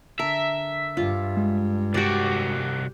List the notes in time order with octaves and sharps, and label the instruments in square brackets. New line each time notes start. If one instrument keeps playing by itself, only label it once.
[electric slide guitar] D3 A5 [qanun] A#4 [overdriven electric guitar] E5
[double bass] G2 [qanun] F4
[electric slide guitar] G#3
[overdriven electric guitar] C2 F#4 [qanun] G4 D5